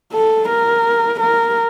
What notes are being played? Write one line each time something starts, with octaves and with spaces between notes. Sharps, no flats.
A4
A#4
A#4